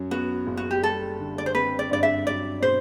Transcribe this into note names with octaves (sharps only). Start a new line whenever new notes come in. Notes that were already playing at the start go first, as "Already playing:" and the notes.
Already playing: F#2 F#3
B3 F#4
F#1
F#4
G4
G3 A4
D3
D5
C5
C4 B4
D5
G2 D5
E5
F#3 D5
B2 C5